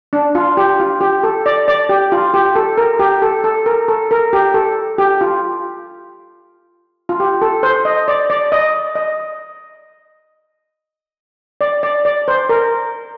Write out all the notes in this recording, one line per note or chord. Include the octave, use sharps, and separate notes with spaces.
D4
F4
G4
F4
G4
A4
D5
D5
G4
F4
G4
A4
A#4
G4
A4
A4
A#4
A4
A#4
G4
A4
G4
F4
F4
G4
A4
C5
D#5
D5
D5
D#5
D#5
D5
D5
D5
C5
A#4